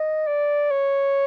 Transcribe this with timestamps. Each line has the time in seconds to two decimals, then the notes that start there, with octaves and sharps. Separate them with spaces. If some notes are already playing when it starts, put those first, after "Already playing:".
Already playing: D#5
0.27 D5
0.71 C#5